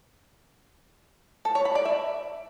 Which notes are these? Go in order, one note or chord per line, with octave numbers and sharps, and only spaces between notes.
A4
C#5
B5
D5
E5